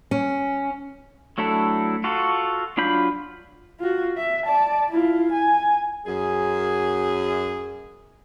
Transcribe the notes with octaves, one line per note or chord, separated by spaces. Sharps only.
C#4
F#3 A3 D4 E4 A4
F4 F#4 A4
F#3 D4 F4 B5 G6
F4 F#4
E5
D5 A5
E4 F4
G#5
F#2 G#4